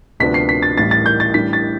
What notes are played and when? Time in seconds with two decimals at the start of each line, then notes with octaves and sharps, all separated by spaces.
0.20 D2 C3 F3 B3 D4 B6
0.34 C7
0.49 B6
0.62 A6
0.77 A1 A2 G3 A6
0.91 A6
1.06 G6
1.20 A6
1.34 A2 E3 G3 D4 B6
1.53 A6